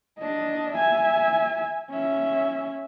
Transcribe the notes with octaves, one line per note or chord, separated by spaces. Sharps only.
D4 D#5
E5 G#5
C#4 E5